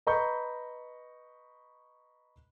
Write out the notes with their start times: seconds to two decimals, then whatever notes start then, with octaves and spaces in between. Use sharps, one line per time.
0.07 B4 D#5 A#5 B5 C#6 G6